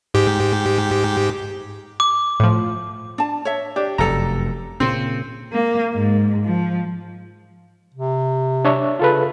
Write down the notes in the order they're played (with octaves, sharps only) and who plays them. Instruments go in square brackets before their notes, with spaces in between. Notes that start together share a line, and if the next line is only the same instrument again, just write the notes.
[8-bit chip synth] G#2 G4
[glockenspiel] D6
[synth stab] A2 F3
[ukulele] D4 A5
C#5 E5
[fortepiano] D4 [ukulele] G4
[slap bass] F1 F#2 [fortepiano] A4 A#5
[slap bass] A#2 C#3 [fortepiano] C4
[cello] A#3
G#2
F3
[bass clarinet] C3
[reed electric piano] D4 C#5 E5
[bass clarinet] C#3 [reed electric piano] F4 A4 B4